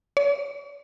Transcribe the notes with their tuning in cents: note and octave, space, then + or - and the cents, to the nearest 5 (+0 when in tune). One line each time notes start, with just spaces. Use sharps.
C#5 +45